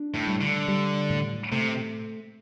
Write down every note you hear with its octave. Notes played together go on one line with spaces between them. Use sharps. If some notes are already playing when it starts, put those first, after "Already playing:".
Already playing: D4
A2
G3
D3
G3
A2
C3 A3